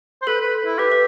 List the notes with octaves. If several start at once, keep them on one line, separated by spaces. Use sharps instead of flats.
C5
A4 B4
B4
E4
G4 B4
B4